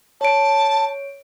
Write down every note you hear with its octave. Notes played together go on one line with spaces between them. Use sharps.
C#5 A5 D7